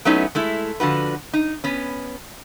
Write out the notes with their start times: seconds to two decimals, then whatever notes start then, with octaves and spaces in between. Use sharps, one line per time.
0.05 F#3 A3 B3 C#4 D#4 E4
0.35 G#3 A3 E4
0.80 D3 F3 F#4 B4
1.33 D#4
1.64 B3 C#4